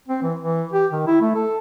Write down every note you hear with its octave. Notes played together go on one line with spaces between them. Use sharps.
C4
E3
E3
G4
D#3
E4
A3
A4